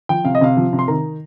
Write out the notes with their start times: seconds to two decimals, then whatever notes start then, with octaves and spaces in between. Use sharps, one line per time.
0.09 F3 G5
0.25 C3 F5
0.35 D#5
0.41 C3 F5
0.57 F3
0.73 C3
0.79 C6
0.88 D#3 A#5